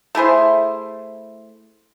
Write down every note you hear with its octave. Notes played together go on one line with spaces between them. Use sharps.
A3 E4 G#4 C5